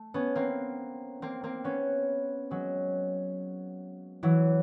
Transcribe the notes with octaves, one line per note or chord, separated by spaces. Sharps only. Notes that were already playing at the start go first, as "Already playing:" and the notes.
Already playing: A3
B3 C#4
A#3 C4
A#3 C4
A#3 C4
B3 C#4
F#3 G#3
E3 F#3